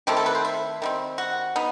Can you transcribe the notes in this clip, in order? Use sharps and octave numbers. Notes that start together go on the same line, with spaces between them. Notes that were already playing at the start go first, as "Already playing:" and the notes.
D#3 A3 C4 E4 G4
A4
B4
C5
E5
D#3 G3 C4
F#4
B3 D#4